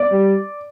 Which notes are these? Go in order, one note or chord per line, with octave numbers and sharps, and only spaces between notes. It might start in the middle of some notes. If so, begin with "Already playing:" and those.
Already playing: D5
G3